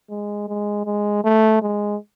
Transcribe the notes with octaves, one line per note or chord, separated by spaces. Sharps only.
G#3
G#3
G#3
A3
G#3